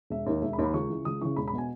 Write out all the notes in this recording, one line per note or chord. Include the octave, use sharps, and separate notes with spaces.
E1 E5
D#2 D#3
E1 E5
B5
D#2 D#3
B5
C#2 C#6
C#3 E3
C#2 D#6
C#3 E3 C#6
E1 B5
B5
B2 G#5